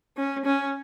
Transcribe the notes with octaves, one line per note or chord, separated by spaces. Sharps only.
C#4
C#4